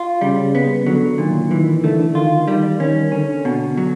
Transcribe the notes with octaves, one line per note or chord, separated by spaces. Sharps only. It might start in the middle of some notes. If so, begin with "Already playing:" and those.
Already playing: F4
C#3 G3
B3
D3 F#3
A#2 D#3
D#3 E3
D3 A3
D#3 F4
D#3 G3
D#3 C#4
D3 C#4
B2
F#3